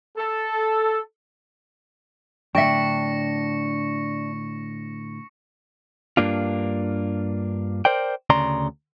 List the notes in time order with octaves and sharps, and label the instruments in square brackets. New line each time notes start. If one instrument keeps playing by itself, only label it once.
[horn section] A4
[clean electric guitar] A2 D3 [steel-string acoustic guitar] D4 [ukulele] E5 G5 [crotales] C#6 A#6 C#7
[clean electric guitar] G2 A#3 D4 F4
A#4 C5 D5 G5
D2 C#3 D5 A#5 C6